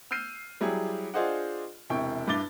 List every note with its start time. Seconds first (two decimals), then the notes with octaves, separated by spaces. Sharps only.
0.11 E6 F6 G6 C7 D#7
0.61 F#3 G3 E4 G4 G#4
1.14 D4 F4 G#4 C5 D#5 F#5
1.90 E1 C3 E4 G5 C#6
2.27 G2 E4 D6 A6 G7